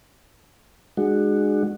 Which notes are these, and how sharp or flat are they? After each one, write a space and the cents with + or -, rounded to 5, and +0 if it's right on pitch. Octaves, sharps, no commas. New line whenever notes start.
G#3 +0 D4 +40 F#4 +0